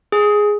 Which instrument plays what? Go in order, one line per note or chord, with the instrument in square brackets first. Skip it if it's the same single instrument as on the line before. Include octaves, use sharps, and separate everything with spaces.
[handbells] G#4